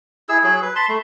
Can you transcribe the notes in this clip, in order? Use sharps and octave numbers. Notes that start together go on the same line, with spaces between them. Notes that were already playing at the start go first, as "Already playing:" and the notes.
E4 G#4 E6
F#3 G#4
B4
A5 B5 C6
A3